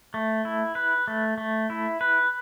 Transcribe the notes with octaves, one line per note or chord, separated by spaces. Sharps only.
A3
E4
B4
A3
A3
E4
B4